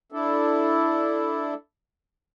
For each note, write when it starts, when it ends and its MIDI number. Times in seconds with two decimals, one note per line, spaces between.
0.12 1.54 62
0.12 1.54 64
0.12 1.54 69